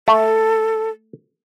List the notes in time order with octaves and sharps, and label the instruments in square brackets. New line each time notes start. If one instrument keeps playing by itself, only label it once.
[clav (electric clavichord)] A3 [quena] A4